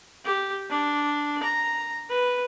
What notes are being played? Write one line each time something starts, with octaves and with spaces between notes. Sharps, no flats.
G4
D4
A#5
B4